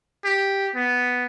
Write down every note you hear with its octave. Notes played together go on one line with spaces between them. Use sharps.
G4
B3